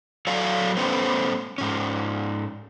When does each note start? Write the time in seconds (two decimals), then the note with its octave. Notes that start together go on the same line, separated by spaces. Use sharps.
0.27 F#3 F#4 A4 C#5 D5 F5
0.77 G3 A3 B3 C#4 B4 C5
1.58 G#2 C#4